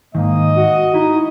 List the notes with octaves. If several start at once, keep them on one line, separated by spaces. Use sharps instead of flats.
G#2 D#3 A#3 D#5
F#4
D#4 E4